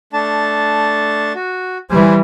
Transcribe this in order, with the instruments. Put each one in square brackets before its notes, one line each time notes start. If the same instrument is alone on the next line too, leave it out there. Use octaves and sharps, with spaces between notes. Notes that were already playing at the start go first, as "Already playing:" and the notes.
[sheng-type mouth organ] A3 D4 A5
F#4
[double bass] E3 G3 [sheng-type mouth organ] C5 G#5